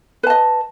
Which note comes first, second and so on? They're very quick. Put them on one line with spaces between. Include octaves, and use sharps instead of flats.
B4 A5 D#5